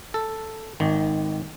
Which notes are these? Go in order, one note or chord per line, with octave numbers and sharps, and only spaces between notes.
A4
G#1 D#3